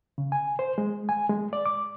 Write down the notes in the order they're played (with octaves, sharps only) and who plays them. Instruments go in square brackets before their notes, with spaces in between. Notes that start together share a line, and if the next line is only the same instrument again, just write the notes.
[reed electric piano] C#3
G#5
C5
G#3
G#5
G#3
D5
D6